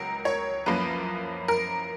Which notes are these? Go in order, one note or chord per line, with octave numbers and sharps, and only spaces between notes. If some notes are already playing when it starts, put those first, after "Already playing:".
Already playing: C#2 F#3 A#4
C#5
F#2 F3 A#3 C#4 B4
A#4